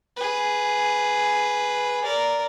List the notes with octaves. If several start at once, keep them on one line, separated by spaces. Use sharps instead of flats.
G#4 B4
A#4 D5